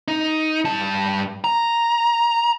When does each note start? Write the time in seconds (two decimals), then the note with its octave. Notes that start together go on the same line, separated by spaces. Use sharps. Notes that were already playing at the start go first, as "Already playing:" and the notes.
0.08 D#4
0.65 G2 A5
1.44 A#5